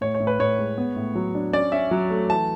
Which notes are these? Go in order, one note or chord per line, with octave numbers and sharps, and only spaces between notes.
A2 C#5
C#5
A2
B4
A2 C#5
G#3
B3
A2
F#3
D4
C#4 D5
C#4 E5
F#3
A3
E3 A5